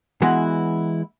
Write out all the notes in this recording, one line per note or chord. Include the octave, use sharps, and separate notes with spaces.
E3 G#3 B3 E4 F#4